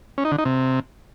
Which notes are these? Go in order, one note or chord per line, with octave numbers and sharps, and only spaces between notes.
C#4
D#4
D3
D#4
C3